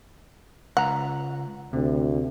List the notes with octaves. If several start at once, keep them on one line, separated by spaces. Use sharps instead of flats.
C#2 F#5 A#5
D2 C3